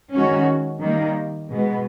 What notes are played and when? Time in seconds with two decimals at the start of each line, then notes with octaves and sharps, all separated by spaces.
0.15 D#3 G#3 C#4 F#4
0.82 D#3 G3 A#3
1.51 B2 G#3 B3